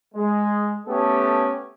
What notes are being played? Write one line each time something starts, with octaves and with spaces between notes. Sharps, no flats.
G#3
A3 B3 C#4 G4 A4